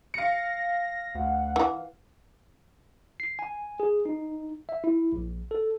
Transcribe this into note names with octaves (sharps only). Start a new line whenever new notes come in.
F5 A#6 C#7
D2 F#5
E3
C7
G#5
G#4
D#4
E5
E4
A#1
A4